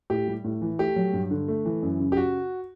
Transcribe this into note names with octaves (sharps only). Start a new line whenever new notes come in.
A2 G4
G3
A2
E3
A3 G4
F#3
G2
D3
A3
E3
F#2
C#3
G4
F#4